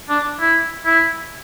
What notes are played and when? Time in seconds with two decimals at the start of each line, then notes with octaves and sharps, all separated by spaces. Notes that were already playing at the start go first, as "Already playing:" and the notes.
0.09 D4
0.40 E4
0.86 E4